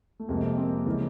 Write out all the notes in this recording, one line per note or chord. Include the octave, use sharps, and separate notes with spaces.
A3
F2 C3 F3 G#3 A#3
A#3 C4
C#3 E3 G#3